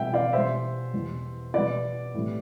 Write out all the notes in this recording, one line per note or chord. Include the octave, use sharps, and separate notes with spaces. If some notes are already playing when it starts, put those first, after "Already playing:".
Already playing: B2 G3 E5 G5
D5 F5
B2 G3 C5 E5
E2 B2 G3
B2 G3 B4 D5
A2 G3